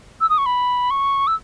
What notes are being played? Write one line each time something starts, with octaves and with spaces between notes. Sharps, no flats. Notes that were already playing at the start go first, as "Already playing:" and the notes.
E6
D#6
C#6
B5
C#6
E6